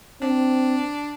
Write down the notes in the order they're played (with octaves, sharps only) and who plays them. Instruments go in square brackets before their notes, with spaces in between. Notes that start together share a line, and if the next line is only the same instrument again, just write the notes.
[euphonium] C4 [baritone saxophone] D4